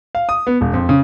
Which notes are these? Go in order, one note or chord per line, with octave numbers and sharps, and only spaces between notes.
F5
D#6
B3
E1
F2
C#3